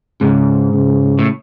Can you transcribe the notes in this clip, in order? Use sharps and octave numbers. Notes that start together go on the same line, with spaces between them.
G#2 C#3
C#3
A2